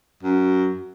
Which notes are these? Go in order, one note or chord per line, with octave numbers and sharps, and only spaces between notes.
F#2